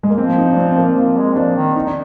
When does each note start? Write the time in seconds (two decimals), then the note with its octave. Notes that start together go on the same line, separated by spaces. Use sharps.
0.03 G#3
0.10 A#3
0.18 F3 C4
0.38 D#4
0.52 D4
0.57 C4
0.78 A#3
0.97 F3 C4
1.17 G#3
1.36 F3 D4
1.56 D#3
1.76 D#4
1.87 D4